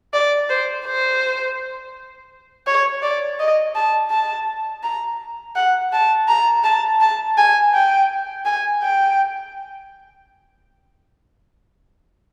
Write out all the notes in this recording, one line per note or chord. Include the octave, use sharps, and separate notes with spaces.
D5
C5
C5
C#5
D5
D#5
A5
A5
A#5
F#5
A5
A#5
A5
A5
G#5
G5
G#5
G5